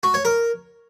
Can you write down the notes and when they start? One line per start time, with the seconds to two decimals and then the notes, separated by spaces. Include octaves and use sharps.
0.03 F#4
0.14 C#5
0.25 A#4